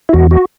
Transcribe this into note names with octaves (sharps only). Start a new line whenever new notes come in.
E4
E2 F#4
F#4